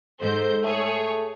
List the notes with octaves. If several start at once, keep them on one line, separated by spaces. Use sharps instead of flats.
G#2 A4 C5 G6
A3 G#4 C#5